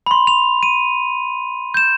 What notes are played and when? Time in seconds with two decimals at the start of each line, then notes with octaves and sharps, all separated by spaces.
0.06 B5 C6
0.27 F7
0.63 D#7
1.74 G6 E7